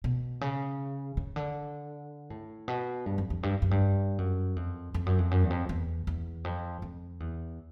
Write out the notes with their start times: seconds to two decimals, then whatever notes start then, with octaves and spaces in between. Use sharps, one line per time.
0.04 B2
0.41 C#3
1.17 C#3
1.36 D3
2.30 A2
2.68 B2
3.06 G2
3.18 F2
3.30 F2
3.43 G2
3.62 F#2
3.71 G2
4.18 F#2
4.56 F2
4.94 F2
5.06 F#2
5.19 F2
5.31 F#2
5.44 E2
5.50 F2
5.69 E2
6.07 E2
6.44 F2
6.82 F2
7.20 E2